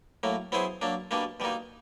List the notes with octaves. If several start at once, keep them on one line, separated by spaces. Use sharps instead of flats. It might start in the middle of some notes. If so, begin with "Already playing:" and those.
A2 F#3 A#3
F#3 B3 E4 G#4 C5
F#3 A#3 D4
B2 G3 A#3 D4
B2 G3 A#3 D#4